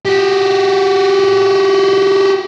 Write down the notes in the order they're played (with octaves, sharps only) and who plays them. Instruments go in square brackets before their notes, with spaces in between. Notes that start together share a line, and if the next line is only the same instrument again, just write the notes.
[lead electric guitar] F#4 G4